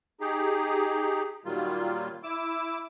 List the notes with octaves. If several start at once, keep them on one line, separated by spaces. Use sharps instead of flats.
D#4 G4 G#4
A#2 D#3 F#3 G3 A#3 F4
E4 D6 E6